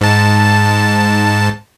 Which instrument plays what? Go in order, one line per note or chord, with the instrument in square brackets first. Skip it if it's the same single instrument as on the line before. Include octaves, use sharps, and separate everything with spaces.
[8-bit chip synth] G#2 A5